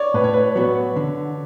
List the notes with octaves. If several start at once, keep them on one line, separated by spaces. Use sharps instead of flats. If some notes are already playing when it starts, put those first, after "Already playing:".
Already playing: C#5 D5
A2 B4
C#5
B4
F#3 B3 F#4
D3